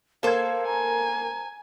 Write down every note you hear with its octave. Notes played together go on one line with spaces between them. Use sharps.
A#3 A4 C5 F5 G#6
G#5 A#5